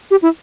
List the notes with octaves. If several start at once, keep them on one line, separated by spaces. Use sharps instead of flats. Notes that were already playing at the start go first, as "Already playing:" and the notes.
G4
E4